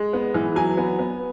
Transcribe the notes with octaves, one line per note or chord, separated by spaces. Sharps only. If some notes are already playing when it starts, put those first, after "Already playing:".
Already playing: G#3
B3
E3
F#3 G#5
B3
B3